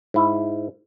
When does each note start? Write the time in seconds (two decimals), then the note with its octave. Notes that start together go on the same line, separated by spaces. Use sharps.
0.14 G#2 E4